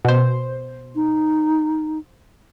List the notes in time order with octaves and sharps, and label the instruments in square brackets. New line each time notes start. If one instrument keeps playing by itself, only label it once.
[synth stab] B2 C5
[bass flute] D#4